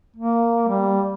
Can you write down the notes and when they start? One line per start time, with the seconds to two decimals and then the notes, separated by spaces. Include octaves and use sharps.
0.16 A#3
0.68 G3